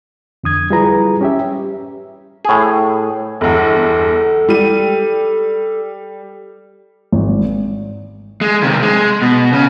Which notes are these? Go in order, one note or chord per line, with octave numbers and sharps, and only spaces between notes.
F2 D3 D#6 G#6
G3 E4 F4 G#4 B4 A#5
C#4 G4 E5
A2 G#4
G1 E2 A4
G3 D#7
G#1
G#3
C3 D#3
G#3
B2
C#3